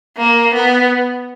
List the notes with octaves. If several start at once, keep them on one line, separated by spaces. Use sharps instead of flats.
A#3
B3